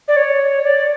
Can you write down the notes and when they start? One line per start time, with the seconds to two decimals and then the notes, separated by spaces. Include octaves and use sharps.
0.08 D5
0.16 C#5
0.64 D5